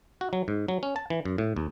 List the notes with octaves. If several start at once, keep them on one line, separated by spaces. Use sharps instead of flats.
F#4
F#3
G#2
F#3
C#4
A5
E3
F#2
A2
D#2